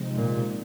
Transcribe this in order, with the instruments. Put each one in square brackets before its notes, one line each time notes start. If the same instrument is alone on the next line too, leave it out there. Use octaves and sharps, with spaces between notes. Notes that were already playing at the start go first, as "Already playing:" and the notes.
Already playing: [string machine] C3 F3 G#3 C4 D#4
[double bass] A#2